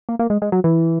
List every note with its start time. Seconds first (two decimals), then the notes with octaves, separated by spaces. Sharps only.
0.09 A#3
0.19 A#3
0.30 G#3
0.42 G#3
0.52 F#3
0.64 E3